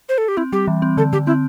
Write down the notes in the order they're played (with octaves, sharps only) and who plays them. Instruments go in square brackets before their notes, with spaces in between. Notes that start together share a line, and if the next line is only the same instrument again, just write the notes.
[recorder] C5
A4
G4
[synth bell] C4 [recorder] E4
[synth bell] G3 [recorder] G4
[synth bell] E3
C4
[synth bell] D3 [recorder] A4
[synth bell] D3 [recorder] G4
[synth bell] C4 [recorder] E4